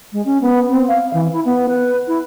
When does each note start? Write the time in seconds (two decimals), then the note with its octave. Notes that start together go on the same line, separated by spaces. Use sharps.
0.12 G#3
0.25 C#4
0.41 B3
0.69 C4
0.88 F5
1.13 E3
1.32 E4
1.45 B3
1.68 B4
2.07 E4